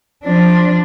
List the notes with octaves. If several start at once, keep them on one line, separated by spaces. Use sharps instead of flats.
F3 D4